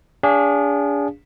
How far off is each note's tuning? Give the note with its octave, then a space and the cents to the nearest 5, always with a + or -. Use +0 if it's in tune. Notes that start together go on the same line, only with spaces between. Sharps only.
D4 -35 G#4 -25 F5 +0